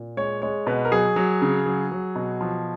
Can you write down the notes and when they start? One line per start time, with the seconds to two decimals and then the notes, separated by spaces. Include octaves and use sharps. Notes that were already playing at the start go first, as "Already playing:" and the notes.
Already playing: A#2
0.17 G#3 C#5
0.42 G#3 C#5
0.67 B2 B4
0.85 A#4
0.92 F#3 G#4
1.16 F#3
1.42 C#3
1.66 F#3
1.92 F#3
2.16 B2
2.41 F3